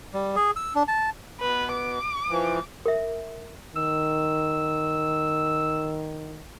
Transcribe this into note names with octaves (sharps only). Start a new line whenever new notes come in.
G3
G#4
E6
D4
A5
B2 B4
D6
E3 F3
A#4 E5
D#3 E6